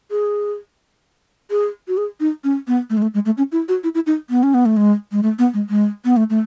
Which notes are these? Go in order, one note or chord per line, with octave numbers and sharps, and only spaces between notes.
G#4
G#4
F#4
G#4
D#4
C#4
B3
A3
G#3
A3
G#3
A3
C#4
E4
F#4
E4
E4
D#4
B3
C#4
B3
A3
G#3
G#3
A3
B3
G#3
G#3
B3
A3
A3